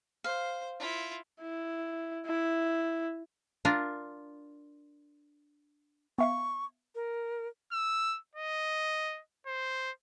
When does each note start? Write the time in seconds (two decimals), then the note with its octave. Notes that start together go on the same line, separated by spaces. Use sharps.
0.24 C5 F5
0.80 E4 F4
1.41 E4
2.26 E4
3.65 D4 F4 A#4
6.18 B3 E5 F5 C#6
6.95 A#4
7.72 E6
8.35 D#5
9.46 C5